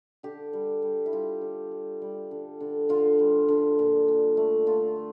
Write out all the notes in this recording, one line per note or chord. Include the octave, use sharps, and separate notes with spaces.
D3 G4
G3
G3
E4
G3 F4
D3
G3
G3
D3
D3
D3 F4
G3
D3
A#2
A#2
A3
A3 F4
A3